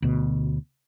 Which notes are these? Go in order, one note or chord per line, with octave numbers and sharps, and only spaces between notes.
D2 B2